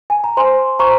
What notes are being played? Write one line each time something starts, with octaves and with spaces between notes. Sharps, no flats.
G#5
A#5
C5 G#5 C6
C5 A#5 C#6